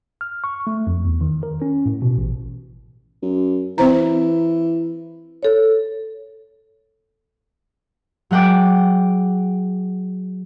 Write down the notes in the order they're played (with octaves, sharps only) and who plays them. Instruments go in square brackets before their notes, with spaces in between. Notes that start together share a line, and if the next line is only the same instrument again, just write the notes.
[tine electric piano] F6
C#6
A3
F2
E2
D#3
A#4
C#4
A2
B2
A1
[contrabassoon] F#2
[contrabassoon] E3 [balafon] C4 C5 A#5
[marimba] A4 C#5
[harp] F#3 G#3 F#5 G5 D6